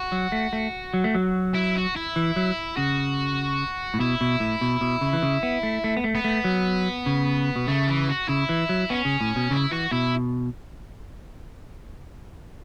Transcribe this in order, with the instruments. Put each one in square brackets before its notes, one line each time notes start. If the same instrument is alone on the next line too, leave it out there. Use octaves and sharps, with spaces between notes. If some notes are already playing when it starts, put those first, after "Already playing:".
Already playing: [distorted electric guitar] F#4
[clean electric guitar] F#3
A3
A3
F#3
A3
F#3
[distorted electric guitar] E4
F#4
E4
[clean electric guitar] E3
F#3
[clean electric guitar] C#3 [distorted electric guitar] F#4
[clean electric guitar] A2
[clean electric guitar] B2 [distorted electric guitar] E4
[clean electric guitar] B2
A2
B2
B2
C#3
E3
C#3
B3
A3
A3
B3
A3
[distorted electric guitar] B3
[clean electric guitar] A3
F#3
C#3
B2
[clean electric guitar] C#3 [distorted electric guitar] A3
[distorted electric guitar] E3
F#4
[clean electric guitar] C#3 [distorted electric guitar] E4
[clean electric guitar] E3
F#3
[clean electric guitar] B3 [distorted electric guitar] C#4
[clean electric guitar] C#3
A2
B2
[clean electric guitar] C#3 [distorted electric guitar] E4
[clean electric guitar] E3 [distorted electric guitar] F#4
[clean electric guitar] B2 [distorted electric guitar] E4